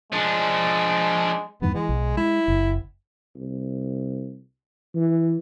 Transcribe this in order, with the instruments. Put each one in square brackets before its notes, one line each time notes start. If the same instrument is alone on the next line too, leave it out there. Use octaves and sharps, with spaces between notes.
[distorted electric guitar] F3 D4 [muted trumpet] G#3
[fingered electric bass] E2 G2 D#3 [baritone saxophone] B3
[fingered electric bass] E3 [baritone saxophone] G#3
[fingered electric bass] B1
[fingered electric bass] G#3 [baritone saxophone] E4
[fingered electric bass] F#1
[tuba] C2
E3